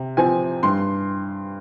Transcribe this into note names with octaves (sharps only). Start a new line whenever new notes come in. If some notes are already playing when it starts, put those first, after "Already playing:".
Already playing: C3
F3 C4 G#5
G2 C6